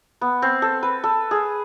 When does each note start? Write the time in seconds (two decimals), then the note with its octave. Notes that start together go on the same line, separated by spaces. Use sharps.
0.21 B3
0.42 C4
0.62 A4
0.83 B4
1.04 A4
1.31 G#4